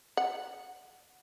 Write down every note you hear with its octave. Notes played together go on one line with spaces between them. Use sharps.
F#5